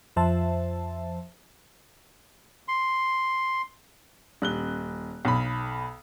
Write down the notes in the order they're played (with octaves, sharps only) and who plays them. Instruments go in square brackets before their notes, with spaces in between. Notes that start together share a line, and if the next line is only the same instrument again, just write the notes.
[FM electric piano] F2 F3 C5 E5 A5
[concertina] C6
[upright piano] D#1 F#6 G7
B1 B5